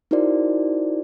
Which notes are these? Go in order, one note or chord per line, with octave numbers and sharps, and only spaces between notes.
D#4 E4 F#4 A#4 C5 D5